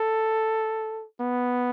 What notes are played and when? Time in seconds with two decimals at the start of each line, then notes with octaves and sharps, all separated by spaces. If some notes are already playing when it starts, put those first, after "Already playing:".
Already playing: A4
1.20 B3